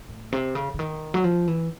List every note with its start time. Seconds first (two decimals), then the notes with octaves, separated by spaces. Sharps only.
0.09 A2
0.32 C3
0.55 C#3
0.74 D3
0.79 D#3
1.14 F#3
1.24 F3
1.47 E3